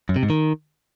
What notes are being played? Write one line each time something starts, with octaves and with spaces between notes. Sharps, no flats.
F#2
C3
G#2
D#3